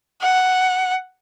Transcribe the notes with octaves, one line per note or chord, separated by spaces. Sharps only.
F#5